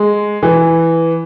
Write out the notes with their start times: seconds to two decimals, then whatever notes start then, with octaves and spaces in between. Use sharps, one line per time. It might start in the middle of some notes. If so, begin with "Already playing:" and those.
Already playing: G#3
0.43 E3